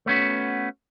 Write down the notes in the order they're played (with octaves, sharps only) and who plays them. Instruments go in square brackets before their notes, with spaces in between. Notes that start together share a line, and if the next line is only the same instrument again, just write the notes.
[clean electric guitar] A3 B3 C#4 F#4